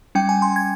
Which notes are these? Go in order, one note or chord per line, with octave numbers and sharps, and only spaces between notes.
G3 C#4 G5
G#5
C6
G#6